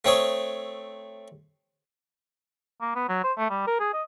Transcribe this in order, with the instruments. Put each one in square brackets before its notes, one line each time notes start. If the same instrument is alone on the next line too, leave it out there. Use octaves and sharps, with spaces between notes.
[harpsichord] A3 C4 C#5 D#6
[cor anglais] A#3
B3
F#3
C5
A3
G3
A#4
G#4
D#5